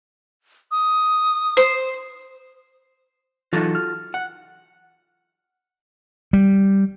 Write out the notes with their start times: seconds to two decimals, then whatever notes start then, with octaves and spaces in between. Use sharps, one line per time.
0.71 D#6
1.57 C5
3.53 E3 F#3 D#4 F4 F#4 A4
3.75 F6
4.14 F#5
6.33 G3